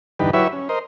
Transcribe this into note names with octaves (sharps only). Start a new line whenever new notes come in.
E2 G2 D3 D#4 G4 B4
F#3 E4 G4 B4 C#5 E5
C#4
A#4 C5 D#5